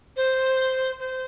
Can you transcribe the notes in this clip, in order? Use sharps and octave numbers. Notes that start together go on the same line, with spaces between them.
C5
C5